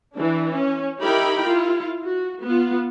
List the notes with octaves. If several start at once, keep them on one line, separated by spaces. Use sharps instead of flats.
E3 D4
C#4
D#4 E4 G4 A#4 G5 B5
E4 F4
F#4
B3 F4